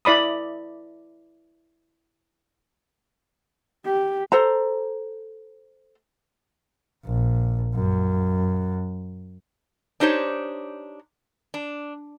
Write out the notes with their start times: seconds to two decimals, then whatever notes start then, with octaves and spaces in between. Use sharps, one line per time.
0.05 E4 D5 B5 D#6
3.85 G4
4.32 A4 C5 A#5
7.05 A#1
7.74 F#2
10.00 D4 D#4 G4 C5 C#5
11.54 D4